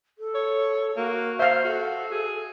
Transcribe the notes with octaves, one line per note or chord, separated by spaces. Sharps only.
A4
C#5
A#3 F#4
C5 E5 F5
F#4 A4
G#4